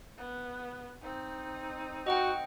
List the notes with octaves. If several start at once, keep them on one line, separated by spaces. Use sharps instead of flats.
B3
C4 D#4
F#4 D#5 F#5 G5